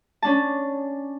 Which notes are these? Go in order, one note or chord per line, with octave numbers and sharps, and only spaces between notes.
C#4 D4 A5